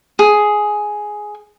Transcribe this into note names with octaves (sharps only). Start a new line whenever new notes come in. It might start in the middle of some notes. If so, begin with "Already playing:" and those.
G#4